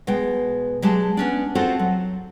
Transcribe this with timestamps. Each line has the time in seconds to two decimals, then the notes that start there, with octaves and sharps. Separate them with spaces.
0.07 B2 G#3 G5
0.82 F#3 G#3 G4 A5
1.17 B3 C#4 D4
1.55 C4 F4 F#4 A4 C5 F#5
1.79 F#3